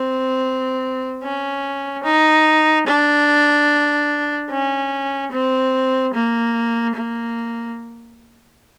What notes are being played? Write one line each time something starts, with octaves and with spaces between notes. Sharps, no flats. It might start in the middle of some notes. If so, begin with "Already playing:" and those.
Already playing: C4
C#4
D#4
D4
C#4
C4
A#3
A#3